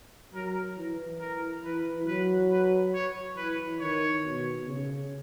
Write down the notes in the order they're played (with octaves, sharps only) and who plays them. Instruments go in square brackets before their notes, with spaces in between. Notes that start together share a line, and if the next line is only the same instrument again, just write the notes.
[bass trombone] F#3 [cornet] A#4
[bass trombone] E3
[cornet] A#4
[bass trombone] E3 [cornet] B4
[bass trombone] F#3 [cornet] B4
[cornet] B4
C#5
[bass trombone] E3 [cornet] B4
[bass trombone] D#3 [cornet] C#5
[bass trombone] B2
C#3